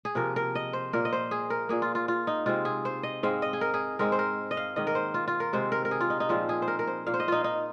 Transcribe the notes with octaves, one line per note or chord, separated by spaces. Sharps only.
G#4
C3 F3 A#3 A#4
A#4
D#5
C5
A#2 A#3 A#4
D#5
C5
G#4
A#4
A#2 A#3 G#4
F4
F4
F4
D#4
C3 G#3 C4 F4
G#4
C5
D#5
G#2 G#3 C4 F5
D#5
G#4
A#4
G#4
G#2 G#3 C4 A#4
C5
A#4
D#5
F5
G#2 D#3 A#3 D#5
A#4
C5
F4
F4
A#4
C3 G#3 C4 C5
A#4
A#4
G#4
F4
D#4
D#4
A#2 F3 G#3 C4 F4
G#4
C5
A#4
A#4
C5
A#2 A#3 F5
C5
D#5
D#4 F4
D#4